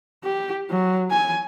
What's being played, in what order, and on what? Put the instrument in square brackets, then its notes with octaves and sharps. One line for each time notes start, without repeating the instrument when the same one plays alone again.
[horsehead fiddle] G4
F#3
G#5